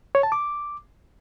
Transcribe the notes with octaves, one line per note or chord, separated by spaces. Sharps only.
C#5
A5
D6